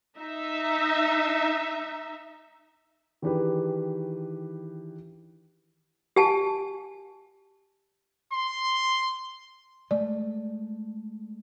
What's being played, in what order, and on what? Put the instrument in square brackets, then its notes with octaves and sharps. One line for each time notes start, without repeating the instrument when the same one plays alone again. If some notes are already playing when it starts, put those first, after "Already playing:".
[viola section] D#4 E5
[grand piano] D#3 E3 D4 G4 G#4 B4
[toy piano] G4 G#5 A5
[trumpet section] C6
[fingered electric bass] G#3 A3 [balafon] D5